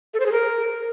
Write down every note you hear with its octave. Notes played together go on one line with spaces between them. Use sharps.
A4
C5
G#4
A#4